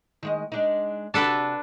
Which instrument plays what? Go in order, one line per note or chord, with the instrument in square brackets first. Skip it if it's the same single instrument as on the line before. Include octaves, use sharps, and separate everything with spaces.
[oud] D#3 G#3 D#5
G#3 D4 D#4
[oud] C3 F#4 G4 [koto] D4 A4 B4